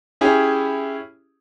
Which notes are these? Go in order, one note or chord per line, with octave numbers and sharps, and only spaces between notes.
C#4 E4 G4 G#4